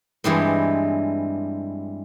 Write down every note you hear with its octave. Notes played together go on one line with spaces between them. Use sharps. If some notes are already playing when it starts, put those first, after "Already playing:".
G2 E3 G#3 C4